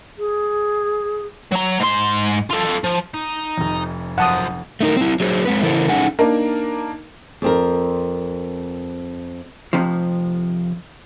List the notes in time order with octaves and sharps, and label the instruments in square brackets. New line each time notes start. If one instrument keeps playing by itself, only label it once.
[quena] G#4
[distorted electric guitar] F#3 A#5
G#2 C6
F4 A4
F3
D#4
[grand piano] F1 F2
[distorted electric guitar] F#2 F3 [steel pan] F#5 A5 D#6
[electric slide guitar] A3 D#4 A#4
C4 E4
F#3 G#4 C5
G#3 C4 B4
C#3 E3 E4 A4 A#4 C5
C#4 D#4 G#4 A4 F#5 G#5
[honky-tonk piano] A#3 D4 D#4 A#4
[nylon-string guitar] F2 C4 A#4
[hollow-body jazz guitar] F2 C3 F3